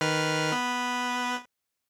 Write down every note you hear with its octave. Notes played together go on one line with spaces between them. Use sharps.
D#3 B4 F6
B3 B4